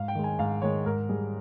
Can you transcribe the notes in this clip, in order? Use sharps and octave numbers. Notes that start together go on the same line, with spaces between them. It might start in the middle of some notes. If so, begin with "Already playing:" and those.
Already playing: G#2 F5
G5
D#3 G#3
G#5
G#2 F5
D#3 G#3 C#5
G#2 A#4
G3 G#4